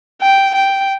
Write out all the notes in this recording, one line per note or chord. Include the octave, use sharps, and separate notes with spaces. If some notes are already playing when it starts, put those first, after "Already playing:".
G5
G5